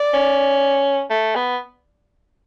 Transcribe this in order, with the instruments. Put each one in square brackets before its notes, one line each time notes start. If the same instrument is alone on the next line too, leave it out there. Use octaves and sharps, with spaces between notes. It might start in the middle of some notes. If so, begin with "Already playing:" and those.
Already playing: [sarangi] D5
[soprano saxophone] C#4
A3
B3